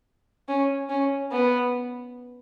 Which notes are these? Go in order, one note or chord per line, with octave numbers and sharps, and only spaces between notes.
C#4
C#4
B3